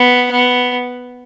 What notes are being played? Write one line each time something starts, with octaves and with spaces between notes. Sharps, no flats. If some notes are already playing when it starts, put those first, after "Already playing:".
Already playing: B3
B3